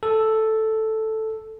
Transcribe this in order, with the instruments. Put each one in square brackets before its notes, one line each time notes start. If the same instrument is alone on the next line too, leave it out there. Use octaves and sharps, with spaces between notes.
[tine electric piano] A4